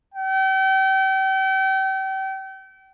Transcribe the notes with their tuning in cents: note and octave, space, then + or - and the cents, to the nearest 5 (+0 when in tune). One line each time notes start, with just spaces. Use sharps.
G5 -35